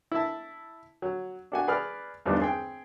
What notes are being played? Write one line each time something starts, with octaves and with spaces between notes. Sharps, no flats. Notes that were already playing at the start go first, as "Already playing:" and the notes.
E4 A5
F#3
D4 F#4 G#5
G#4 B4 D5 F6
E2 G2 F3 G3 D4 D#4
C4 G#4 G5